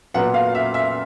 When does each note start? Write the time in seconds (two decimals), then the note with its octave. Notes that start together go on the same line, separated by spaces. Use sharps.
0.14 A#2 F#3 B3 F#5
0.34 F5
0.55 E5
0.74 E5